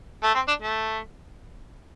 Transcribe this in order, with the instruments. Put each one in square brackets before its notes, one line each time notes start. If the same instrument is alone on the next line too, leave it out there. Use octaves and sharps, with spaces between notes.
[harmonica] A3
C4
D4
A3